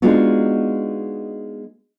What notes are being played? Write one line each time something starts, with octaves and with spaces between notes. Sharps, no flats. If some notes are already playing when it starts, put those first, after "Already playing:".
G#3 B3 D4 D#4 F4 F#4